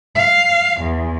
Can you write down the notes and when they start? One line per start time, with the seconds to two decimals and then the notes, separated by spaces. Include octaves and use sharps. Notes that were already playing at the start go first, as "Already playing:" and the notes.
0.15 F5
0.80 E2